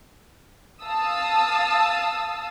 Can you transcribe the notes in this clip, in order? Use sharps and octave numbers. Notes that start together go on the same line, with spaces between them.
F5 A5 D#6 E6